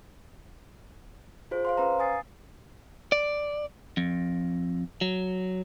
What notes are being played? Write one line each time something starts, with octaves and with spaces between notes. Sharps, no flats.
F4 G#4 C5
C5 F5 C6
C#4 B4 F5 A#5
G#5 D#6 A6 C7
D5
F2
F#3